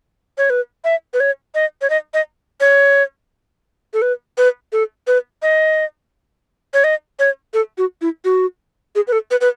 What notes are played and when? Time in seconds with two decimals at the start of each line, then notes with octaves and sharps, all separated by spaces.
0.38 C#5
0.50 B4
0.84 E5
1.14 B4
1.20 C#5
1.55 D#5
1.81 C#5
1.90 D#5
2.14 D#5
2.60 C#5
3.94 A4
4.02 B4
4.38 B4
4.72 A4
5.07 B4
5.42 D#5
6.74 C#5
6.84 D#5
7.19 C#5
7.54 A4
7.78 F#4
8.01 E4
8.25 F#4
8.95 G#4
9.07 B4
9.12 A4
9.31 B4
9.41 B4